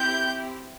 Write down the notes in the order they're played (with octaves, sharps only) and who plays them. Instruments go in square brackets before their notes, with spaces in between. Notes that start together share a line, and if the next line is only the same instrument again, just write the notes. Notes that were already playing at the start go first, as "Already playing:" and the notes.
Already playing: [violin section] C4 E4 G4 G6